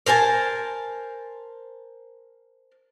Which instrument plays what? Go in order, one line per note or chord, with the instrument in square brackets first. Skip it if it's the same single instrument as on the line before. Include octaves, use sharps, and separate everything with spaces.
[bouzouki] A#4 C5 G#5 A5